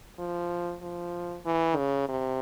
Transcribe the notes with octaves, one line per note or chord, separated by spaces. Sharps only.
F3
F3
E3
C#3
C3